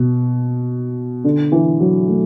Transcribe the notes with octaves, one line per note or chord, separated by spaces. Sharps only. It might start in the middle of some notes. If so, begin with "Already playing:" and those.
Already playing: B2
D3
E3
F#3
A3